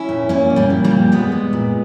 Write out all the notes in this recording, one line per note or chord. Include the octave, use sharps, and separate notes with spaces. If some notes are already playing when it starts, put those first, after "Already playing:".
Already playing: C#4 E4
A#2
A#2 A#3 C#4
A#2
G3 A#3
A#2
G3 A#3
A#2
A#2 G#3 B3
A#2
A#2